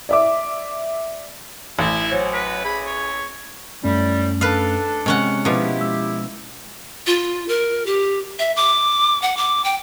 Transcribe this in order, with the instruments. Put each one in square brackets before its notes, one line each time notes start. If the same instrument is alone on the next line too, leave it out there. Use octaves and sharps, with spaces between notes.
[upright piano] D5 E5 D6
[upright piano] A1 [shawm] E4
[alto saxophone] F#3 [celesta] C5 C#5 G#5
[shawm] B4 [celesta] B6
[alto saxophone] G#4 [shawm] B5
[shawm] C#5
[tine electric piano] F#2 A3 C#4 [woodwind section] A2 G3
[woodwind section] D4 A4 [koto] B4 F5
[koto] C3 C#4 F#5 [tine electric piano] G#3
[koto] B2 F3 [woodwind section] E4 G4
[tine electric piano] G#3 E6
[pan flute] F4
A#4
G4
E5
D6
F#5
D6
G5